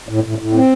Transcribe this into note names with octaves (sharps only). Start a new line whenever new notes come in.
A2
A2
A2
C4